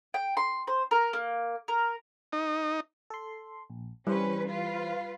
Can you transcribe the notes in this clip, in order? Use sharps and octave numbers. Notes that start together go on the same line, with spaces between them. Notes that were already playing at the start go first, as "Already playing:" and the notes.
G5
C6
C5
A#4
A#3
A#4
D#4
A4 C6
A#1
E3 G3 C#4 B4 C5
F4 B4 F5